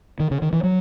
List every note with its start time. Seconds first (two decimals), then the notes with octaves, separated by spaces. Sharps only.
0.20 D#3
0.31 C#3
0.42 D#3
0.53 E3
0.63 F#3